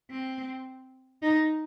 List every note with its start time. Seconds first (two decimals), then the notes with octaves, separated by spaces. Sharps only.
0.10 C4
1.22 D#4